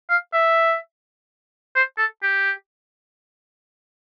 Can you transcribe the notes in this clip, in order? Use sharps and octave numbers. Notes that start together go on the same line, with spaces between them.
F5
E5
C5
A4
G4